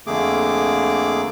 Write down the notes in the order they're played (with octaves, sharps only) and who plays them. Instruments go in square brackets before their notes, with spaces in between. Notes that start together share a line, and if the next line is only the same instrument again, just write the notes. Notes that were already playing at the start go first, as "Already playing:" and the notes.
[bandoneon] F2 D3 A3 A#3 G#4 D6